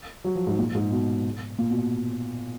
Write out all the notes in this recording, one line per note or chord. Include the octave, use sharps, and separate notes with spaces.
F#3
F3
G#2
A#2
G#2
B2
A#2
B2